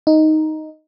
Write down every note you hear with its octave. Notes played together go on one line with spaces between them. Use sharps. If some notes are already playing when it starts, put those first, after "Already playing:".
D#4